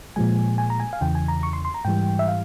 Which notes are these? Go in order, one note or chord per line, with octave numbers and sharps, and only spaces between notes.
A#2 F3 G#3 G#5
G#5
A#5
G#5
F5
E2 C#3 E3 G5
G#5
A#5
C#6
C6
C6
A#5
G#2 E3 G3 G5
E5
F5